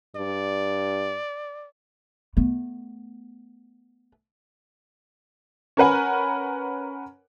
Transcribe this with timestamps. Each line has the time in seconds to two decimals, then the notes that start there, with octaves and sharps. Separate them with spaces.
0.16 G2 D5
2.37 A3 B3
5.77 C#4 A#4 B4 F#5 G#5